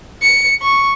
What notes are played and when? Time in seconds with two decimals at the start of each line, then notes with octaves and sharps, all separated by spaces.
0.22 C#7
0.62 C#6